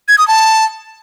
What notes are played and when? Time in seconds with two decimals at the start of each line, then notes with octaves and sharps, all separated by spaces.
0.08 G#6
0.18 D#6
0.28 A5